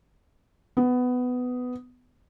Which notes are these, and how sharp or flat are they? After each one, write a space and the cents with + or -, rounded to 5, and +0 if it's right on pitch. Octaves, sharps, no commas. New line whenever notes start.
B3 +15